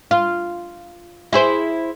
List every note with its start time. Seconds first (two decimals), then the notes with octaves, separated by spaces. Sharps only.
0.11 F4
1.33 E4 G#4 C5